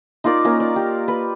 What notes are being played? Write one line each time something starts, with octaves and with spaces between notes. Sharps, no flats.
D#4 F4 A#4 D5
A#3 C#4 A#4 C#5
D5
G4
B4